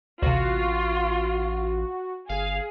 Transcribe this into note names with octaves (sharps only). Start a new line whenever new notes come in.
A1 D2 C3 F4 F#4
G1 G#4 F5